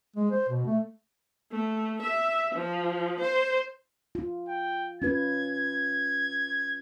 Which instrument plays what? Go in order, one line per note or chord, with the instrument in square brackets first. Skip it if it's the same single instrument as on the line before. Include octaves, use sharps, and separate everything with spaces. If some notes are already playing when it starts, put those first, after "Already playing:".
[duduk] G#3
C5
B2
A3
[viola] A3
E5
F3
C5
[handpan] F4
[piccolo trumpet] G5
[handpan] C#4 F4 B4 [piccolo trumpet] G#6